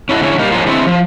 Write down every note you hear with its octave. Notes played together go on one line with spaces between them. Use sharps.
C#4 E4 A4 D#5 F#5
D3 G#3 C#4 E4
G3 A#3 D#4
F3 F#3 G#3 A#3 D4 F4
D3 G#3 A3 B3 C4 E4
F3